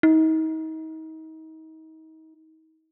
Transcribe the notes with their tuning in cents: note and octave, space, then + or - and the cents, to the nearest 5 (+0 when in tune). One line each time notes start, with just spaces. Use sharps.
D#4 +35